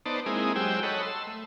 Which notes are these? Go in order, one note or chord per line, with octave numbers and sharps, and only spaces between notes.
B3 D#4 C5 D5 A5
G#3 A#3 C4 D#4 E4 G#4
F#3 G#3 G4 C5 G5 E6
A4 C#5 D#5 F#5 B5
A5 C6 E6
A3